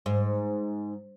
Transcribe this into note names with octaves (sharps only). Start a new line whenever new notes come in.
G#2